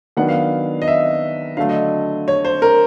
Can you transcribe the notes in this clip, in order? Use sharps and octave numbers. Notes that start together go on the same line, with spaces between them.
D#3 F#3 B3 D4 F#5
F5
D#5
E5
D3 F#3 A3 F5
D#5
C#5
C5
A#4